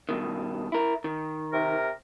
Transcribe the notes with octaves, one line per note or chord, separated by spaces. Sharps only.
G2 B2 D#3
E4 A#4
D#3
C3 A#4